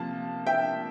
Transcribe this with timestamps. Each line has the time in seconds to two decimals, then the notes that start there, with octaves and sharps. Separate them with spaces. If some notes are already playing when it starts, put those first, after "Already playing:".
Already playing: C3 F3 A#3 A5
0.47 E5 G5